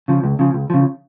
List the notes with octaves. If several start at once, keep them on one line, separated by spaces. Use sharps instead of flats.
C#3 F3
C#2
C#3 F3
C#2
C#3 F3